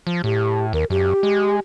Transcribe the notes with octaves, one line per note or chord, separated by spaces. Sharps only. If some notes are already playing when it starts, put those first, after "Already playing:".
F3
A2 G4
D#2 A#4
F#2 G4
G#3